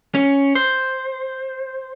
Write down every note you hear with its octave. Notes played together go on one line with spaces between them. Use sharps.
C#4
C5